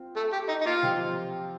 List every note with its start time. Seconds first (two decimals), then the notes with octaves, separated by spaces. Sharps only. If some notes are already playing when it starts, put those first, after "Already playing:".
Already playing: C4 F4
0.16 A3
0.33 G4
0.48 D#4
0.61 D#4
0.66 A#3 F4
0.83 C3 F3 C4 G4